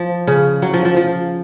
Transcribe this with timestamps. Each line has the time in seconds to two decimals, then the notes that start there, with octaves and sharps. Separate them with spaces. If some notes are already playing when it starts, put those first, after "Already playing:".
Already playing: F3
0.27 C#3
0.62 F#3
0.73 F3
0.85 F3
0.97 F3